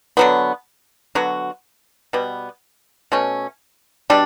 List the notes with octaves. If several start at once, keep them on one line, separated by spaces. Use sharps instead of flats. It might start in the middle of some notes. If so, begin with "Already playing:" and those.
D3 F#3 B3
D3 F#3 B3 F#4
B2 G3 B3
B2 A3 C#4
B2 G3 D4